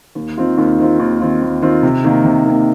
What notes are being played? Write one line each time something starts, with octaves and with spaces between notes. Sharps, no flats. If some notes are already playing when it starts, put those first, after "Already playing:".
D#2
D#3 C4 F4
D#2
D#3 C4 F4
D#2
D#3 C4 F4
D#2
D#3 C4 F4
C3
D#3 A#3
C3
D#3 A#3